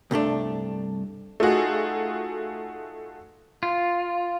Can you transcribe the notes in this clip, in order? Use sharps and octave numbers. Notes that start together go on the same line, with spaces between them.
C2 G2 A3 D4
A3 D#4 F4 F#4 G#4
F4